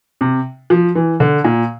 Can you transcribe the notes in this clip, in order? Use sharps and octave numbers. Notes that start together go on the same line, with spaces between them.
C3
F3
E3
D3
A#2